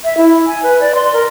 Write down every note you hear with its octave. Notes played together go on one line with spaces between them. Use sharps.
E5
E4
G#5
B4
D5
C6
A#4